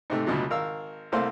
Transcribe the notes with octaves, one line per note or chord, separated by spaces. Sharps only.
G#2 C3 A3
C#2 B2 D3 F#3 A3
G#1 A#4 F5 E6
C2 A3 A#3 C4 C5 C6